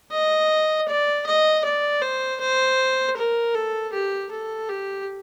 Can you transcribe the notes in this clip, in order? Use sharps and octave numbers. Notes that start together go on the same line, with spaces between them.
D#5
D5
D#5
D5
C5
C5
A#4
A4
G4
A4
G4